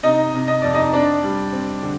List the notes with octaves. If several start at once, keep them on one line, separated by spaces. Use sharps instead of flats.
C3 D#4 D#5
C3
D#5
F2 D5
D#4 D#5
C4 D4 D5
G3
C4
D3